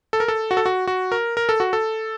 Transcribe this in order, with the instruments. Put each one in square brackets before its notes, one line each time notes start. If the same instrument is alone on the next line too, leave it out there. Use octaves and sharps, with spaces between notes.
[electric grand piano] A4
A#4
A4
F#4
A4
F#4
F#4
A#4
A#4
A4
F#4
A4